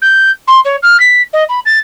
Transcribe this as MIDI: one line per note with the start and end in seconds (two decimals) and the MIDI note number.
0.02 0.31 91
0.47 0.60 84
0.64 0.76 73
0.82 0.99 89
0.99 1.21 95
1.33 1.44 75
1.49 1.59 83
1.65 1.79 93